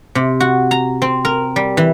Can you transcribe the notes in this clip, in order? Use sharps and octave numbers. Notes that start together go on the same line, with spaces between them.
C3
F#4
A#5
C4
A#4
G3
E3